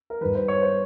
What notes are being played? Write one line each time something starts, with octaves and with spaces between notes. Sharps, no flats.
A#4
G2 D#3 B4
C5
C#5
C5